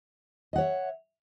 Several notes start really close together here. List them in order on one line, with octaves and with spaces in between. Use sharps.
D#5 F#5 C#5 E5